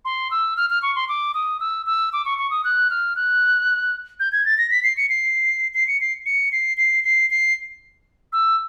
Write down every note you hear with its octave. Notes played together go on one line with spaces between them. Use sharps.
C6
E6
F6
F6
C#6
C6
D6
D#6
E6
E6
D6
C#6
C#6
D#6
F#6
F6
F#6
G6
G#6
A6
A#6
B6
C7
C#7
C7
C7
C#7
C7
C#7
C7
C7
C7
C7
E6